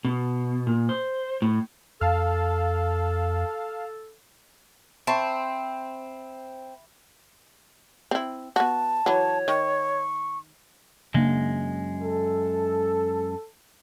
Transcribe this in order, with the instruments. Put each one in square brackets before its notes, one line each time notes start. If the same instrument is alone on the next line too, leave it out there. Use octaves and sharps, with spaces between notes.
[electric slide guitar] B2
A#2
C5
A2
[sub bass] F2 [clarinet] A4 [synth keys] F5 A5
[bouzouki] C4 [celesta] E5 B5 C7 [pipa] A5 C#6
[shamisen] C4 E4
[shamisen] B3 F#4 [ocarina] A5
[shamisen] E3 F#3 [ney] C#5
[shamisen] D#3 [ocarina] C#6
[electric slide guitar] F#2 G#3 [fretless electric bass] C#3 A#3 D4
[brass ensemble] A4